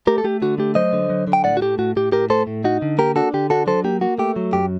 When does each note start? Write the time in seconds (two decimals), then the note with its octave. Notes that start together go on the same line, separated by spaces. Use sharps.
0.07 A3 G4 A#4
0.18 A4
0.24 A3 G4
0.42 D3 F#4
0.58 A3 G4
0.75 F#3 C5 D#5
0.93 D3
1.10 F#3
1.27 D3
1.33 G5
1.44 A2 D5 F#5
1.57 F#4
1.62 A3 G4
1.79 A2 F#4
1.96 A2 G4
2.12 A2 G4 A#4
2.30 A3 A4 C5
2.47 A2
2.64 D#4 F#4
2.82 D3
2.98 A#3 G4 A#4
3.16 D4 F#4 A4
3.34 D3 G4
3.50 D4 F#4 A4
3.67 F#3 A4 C5
3.84 A#3 G4
4.01 A#3 F#4
4.18 A3 G4
4.36 F#3
4.53 F#2 G4